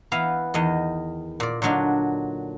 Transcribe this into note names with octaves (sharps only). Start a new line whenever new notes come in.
E3 B3 E5 F5 A#5
E2 D#3 D#5
A#2 D5
A#2 D3 F#3 D4 D#4